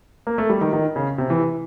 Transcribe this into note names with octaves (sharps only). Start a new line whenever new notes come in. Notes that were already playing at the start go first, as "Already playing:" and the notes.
A#3
A3
G3
D#3
D#3
C#3
C3
E3